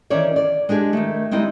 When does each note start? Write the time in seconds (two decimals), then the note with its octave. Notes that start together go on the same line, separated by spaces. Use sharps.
0.10 D#3 E3 C#4 C#5 D5
0.36 D5
0.69 G#3 D4 G4 G#4
0.93 D#3 A3
1.31 G3 G#3 C4 D#4 E4